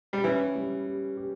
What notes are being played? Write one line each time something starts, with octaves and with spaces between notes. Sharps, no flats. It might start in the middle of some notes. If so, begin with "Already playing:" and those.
G3
E3 C#4
G3
G4
G4